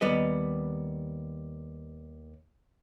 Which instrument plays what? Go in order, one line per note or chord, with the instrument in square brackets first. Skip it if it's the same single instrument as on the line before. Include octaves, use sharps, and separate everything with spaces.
[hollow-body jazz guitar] D#2 G3 B3 B4 D#5